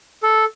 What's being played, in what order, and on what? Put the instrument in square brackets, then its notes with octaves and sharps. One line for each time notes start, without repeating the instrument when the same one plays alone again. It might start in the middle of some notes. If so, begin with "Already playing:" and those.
[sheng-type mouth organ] A4